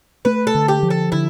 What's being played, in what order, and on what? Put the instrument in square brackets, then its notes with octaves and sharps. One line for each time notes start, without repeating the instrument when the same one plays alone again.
[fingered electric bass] A3 [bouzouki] B4
[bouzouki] A4
[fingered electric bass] D3
[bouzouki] G4
[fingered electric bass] F3
[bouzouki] A4
[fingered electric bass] D3 [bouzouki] E4